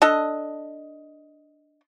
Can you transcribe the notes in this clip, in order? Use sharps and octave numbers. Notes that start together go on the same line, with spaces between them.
D4 A4 D#5